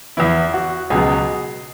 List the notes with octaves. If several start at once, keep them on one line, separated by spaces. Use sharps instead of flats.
E2 E3 E4
F#4
C#2 B2 F#3 G#4